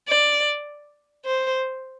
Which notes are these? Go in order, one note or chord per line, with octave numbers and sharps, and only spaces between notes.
D5
C5